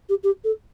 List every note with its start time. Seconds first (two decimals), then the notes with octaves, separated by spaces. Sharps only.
0.09 G4
0.23 G4
0.44 A4